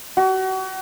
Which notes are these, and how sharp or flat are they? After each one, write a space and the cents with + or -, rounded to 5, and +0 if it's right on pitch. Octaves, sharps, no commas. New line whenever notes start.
F#4 +35